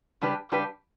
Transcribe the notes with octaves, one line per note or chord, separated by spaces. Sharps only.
C#3 G3 D4 G4 B4
C#3 G3 D4 G4 B4